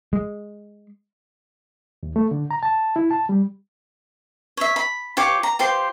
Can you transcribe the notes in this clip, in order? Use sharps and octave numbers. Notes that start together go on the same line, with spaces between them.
G#3
D#2
A3
D3
A#5
A5
E4
A5
G3
C#5 E5
B5
F4 G4 C#5 D6
A#5
F4 G4 C5 C6